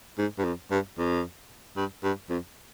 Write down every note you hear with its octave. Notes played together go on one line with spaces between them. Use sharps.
G#2
G2
F2
G2
F2
G2
G2
F2